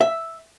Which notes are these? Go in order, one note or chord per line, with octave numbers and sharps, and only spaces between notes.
E5